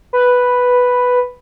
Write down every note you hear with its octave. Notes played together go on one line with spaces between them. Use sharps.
B4